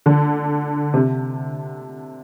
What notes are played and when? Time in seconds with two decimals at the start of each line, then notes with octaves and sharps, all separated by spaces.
0.06 D3
0.94 C3